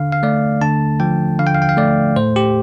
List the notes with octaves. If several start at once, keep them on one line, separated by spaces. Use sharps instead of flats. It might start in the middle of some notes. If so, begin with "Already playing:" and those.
Already playing: D3 F5
F5
A3 D5
D3 A5
F3 G5
D3 F5
G5
F5
G5
F5
A3 D5
A2 C5
G4